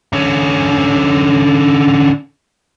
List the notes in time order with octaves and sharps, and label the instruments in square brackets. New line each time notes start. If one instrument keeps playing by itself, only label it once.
[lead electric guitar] D3 C#4